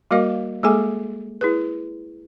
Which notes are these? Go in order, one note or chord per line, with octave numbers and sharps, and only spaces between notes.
G3 A#3 F#4 A#4 D#5 F5
G#3 A#3 G#4 A4 G#5 D6
E4 G#4 B4